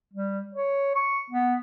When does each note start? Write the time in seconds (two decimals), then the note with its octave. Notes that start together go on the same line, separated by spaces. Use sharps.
0.13 G3
0.54 C#5
0.95 C#6
1.30 B3